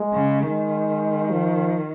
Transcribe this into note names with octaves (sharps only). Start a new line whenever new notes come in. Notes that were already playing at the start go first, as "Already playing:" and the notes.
Already playing: G#3
C#3
D#3 G#3
F3